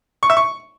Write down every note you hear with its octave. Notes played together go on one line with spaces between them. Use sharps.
C#6
E5
C#6